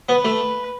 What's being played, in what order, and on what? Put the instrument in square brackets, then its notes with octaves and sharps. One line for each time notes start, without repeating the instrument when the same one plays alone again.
[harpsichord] B3 [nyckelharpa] B4
[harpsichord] A3